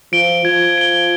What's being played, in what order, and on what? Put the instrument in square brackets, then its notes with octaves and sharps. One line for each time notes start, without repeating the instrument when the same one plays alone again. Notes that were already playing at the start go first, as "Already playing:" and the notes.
[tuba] F3 [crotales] D7 G7
[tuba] F3 [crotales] G#6
[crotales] D7 G7